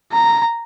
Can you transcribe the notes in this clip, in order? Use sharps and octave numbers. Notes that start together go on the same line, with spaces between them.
A#5